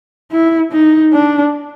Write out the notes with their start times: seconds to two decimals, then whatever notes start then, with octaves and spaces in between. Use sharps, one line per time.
0.32 E4
0.72 D#4
1.13 D4